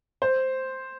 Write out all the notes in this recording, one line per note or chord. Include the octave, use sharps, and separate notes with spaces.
C5